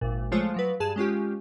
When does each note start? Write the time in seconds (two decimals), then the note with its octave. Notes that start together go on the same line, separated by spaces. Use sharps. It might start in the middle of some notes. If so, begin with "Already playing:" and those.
0.01 G#1 A#2
0.32 F3 G#3 A3 F4 C5 C#5
0.54 F3 F#3 B4
0.80 G2 G#4 A5 E7
0.96 G#3 C#4 F4 G4